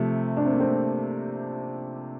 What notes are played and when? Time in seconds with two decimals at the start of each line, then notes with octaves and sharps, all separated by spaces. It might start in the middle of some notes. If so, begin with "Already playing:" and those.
Already playing: C3 F3 A3
0.37 D4
0.45 C4
0.52 A#3
0.60 A3 C4